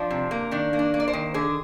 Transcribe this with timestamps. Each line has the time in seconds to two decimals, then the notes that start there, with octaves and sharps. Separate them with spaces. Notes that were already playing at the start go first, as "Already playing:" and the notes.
Already playing: F3 D4
0.10 C3
0.31 A#3
0.51 D#3 D4
0.73 A#3
0.79 D4
0.94 A#3
1.00 D5
1.08 C5
1.13 D#3
1.34 D3 G#4